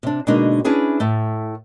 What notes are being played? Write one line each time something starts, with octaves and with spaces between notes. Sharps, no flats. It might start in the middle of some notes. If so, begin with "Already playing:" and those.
C3 D4
B2 D3 G#3 A#3 D4 D#4
C#4 D4 E4 G#4 B4
A2 A3